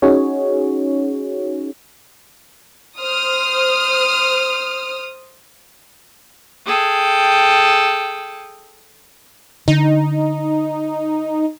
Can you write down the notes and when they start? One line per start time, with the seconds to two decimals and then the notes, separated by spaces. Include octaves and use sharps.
0.02 C#4 D#4 F#4 G#4 C#5
2.98 C5 D#6 F6
6.65 G#4 A4 G5
9.68 D3 D#4